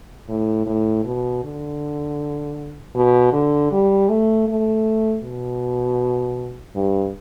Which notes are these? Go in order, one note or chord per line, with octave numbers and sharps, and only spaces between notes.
A2
A2
B2
D3
B2
D3
G3
A3
A3
B2
G2